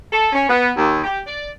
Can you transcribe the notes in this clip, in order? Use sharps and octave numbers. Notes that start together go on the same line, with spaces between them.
A4
C#4
B3
D#2
G4
D5